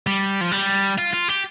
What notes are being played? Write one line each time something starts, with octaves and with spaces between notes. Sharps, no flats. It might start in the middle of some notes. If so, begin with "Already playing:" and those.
G3
F3
G3
F4
F4
G4